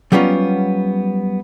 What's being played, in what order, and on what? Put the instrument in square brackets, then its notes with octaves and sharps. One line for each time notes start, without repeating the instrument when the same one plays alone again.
[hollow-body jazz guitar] F#3 G3 B3 C#4 F4